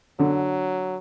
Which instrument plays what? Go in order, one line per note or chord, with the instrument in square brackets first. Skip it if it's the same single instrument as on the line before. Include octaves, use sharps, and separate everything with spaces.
[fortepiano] D3 [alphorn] F#3